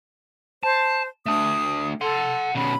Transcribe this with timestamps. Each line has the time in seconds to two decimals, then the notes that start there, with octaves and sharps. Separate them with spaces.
0.63 C5 A5
1.26 A3 D4 D#6
2.01 A4 F#5 C6
2.55 B2 C#4 B5